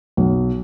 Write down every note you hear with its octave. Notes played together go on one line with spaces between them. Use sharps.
B1